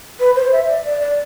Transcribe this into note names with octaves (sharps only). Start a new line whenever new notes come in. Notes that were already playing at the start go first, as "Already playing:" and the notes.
B4
C5
E5
D5
D5
D5